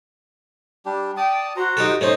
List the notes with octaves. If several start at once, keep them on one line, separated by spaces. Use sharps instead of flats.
G3 D4 G4
D5 G5 A5 D#6
F#4 C5 A#5
D#4 G4 A4
A3 C#4 D#4 C5